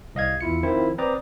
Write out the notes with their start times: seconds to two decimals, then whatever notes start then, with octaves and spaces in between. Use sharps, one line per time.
0.15 C2 D#5 F5 G#6
0.41 E2 E4 F4 C#7
0.63 D#3 F3 C4 E4 F4
0.98 C4 B4 D5 A#5 D6 D#6